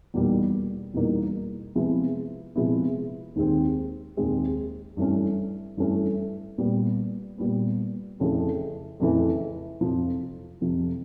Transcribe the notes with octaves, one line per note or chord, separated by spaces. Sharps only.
E2 B2 G3 A#3 D#4
E2 B2 G3 A#3 D#4
C3 F3 G#3 B3 E4
C3 F3 G#3 B3 E4
D#2 D#3 G#3 C4
D#2 D#3 G#3 C4
G2 E3 A3 C#4
G2 E3 A3 C#4
A#2 G3 B3
A#2 G3 B3
F2 C#3 E3 A3
F2 C#3 E3 A3
F2 C3 F3
F2 C3 F3